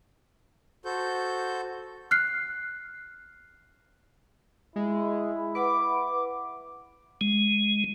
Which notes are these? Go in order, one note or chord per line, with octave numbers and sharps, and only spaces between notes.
F#4 A4 C5 G6
F6 F#6 C7
G#3 E4
B4 F#5 B5 D6
G#3